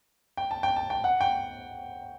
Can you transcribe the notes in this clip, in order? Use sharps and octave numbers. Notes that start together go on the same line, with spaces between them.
G5
A5
G5
A5
G5
F#5
G5